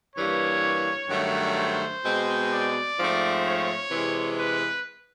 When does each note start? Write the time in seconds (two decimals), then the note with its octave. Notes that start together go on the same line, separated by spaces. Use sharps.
0.16 G2 E3 G3 A#3 C#5
1.09 G2 D#3 F#3 A3
1.56 C5
2.02 B2 G#3 C4
2.50 D5
2.97 G#2 F3 A3 C4
3.43 C#5
3.90 C3 E3 G#3
4.38 B4